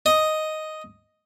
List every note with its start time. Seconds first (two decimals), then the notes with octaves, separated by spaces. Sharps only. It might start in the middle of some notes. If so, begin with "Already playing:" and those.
0.06 D#5